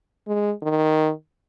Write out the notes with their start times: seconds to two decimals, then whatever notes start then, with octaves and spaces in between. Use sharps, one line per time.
0.27 G#3
0.62 D#3